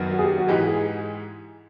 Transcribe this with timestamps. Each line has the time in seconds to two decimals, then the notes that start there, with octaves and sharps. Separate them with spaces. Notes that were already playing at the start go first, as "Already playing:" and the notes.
Already playing: F#2 D#3 F#3 B3
0.11 F#4
0.19 G#4
0.24 G4
0.38 F#4
0.48 G#2 E3 G#3 G4
0.67 G#4